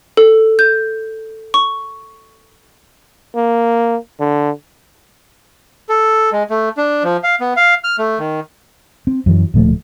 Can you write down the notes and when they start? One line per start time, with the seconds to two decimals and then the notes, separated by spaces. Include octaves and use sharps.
0.17 A4
0.59 G6
1.54 C#6
3.36 A#3
4.20 D3
5.89 A4
6.32 G#3
6.50 A3
6.78 D4
7.03 F3
7.24 F5
7.40 B3
7.57 F5
7.84 F6
7.98 A3
8.19 D#3
9.07 C4
9.26 F#2 E3 F#3
9.54 D1 A#2 F3 A3